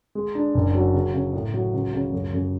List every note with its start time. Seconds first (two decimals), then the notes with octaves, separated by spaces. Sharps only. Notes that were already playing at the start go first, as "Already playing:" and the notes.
0.15 G#3
0.35 D4
0.54 F#1
0.75 F#3
0.94 C#3
1.14 C#3
1.33 A2
1.54 F#3
1.73 C#2
1.93 C#3
2.12 F#2
2.33 F#2